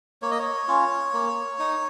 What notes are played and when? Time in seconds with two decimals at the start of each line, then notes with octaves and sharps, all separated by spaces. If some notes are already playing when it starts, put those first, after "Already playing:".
0.22 A#3 C#5
0.31 D#5
0.39 C#5
0.68 C#4 F4
1.13 A#3
1.59 D#4